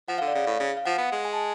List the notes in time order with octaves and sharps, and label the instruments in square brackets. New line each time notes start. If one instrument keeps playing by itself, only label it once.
[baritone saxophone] F3 [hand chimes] F#5
[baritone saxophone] D3 [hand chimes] F5
[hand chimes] D5
[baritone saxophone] C#3 [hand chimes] F5
[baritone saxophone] A2
C#3
[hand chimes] F5
[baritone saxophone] F3 [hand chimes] F#5
[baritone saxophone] B3
G#3
[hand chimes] G#5
A5